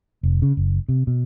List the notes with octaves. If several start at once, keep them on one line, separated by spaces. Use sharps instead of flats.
F1
C#3
F#1
C3
B2